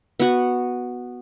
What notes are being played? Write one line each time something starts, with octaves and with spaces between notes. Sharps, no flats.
B3 F#4